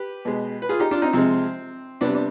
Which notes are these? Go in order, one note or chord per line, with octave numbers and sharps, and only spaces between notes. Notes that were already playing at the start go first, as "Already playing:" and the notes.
Already playing: G4 B4
B2 G#3
B4
F4 G#4
D#4 G4
D4 F4
C4 D#4
C3 F3 G#3 C4
C3 G3 B3 D4
D4